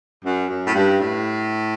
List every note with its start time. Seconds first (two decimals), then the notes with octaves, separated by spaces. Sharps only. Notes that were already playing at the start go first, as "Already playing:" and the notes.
0.25 F#2
0.49 F#2
0.65 A2
0.73 G2
0.98 A2